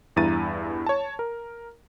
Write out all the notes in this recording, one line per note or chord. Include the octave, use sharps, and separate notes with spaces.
E2 G2 E4 A#5 A6 D#7
C#5 A5
A#4